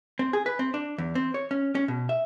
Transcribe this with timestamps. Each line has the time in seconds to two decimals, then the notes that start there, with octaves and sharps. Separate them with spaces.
0.19 C4
0.33 G#4
0.46 B4
0.59 C4
0.74 D4
0.98 E2
1.15 C4
1.34 C#5
1.51 C#4
1.75 C#4
1.88 B2
2.09 E5